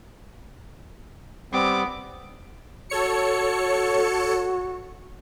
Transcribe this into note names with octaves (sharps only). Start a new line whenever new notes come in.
G3 B3 C4 D6
F#4 A4 C#5 C#7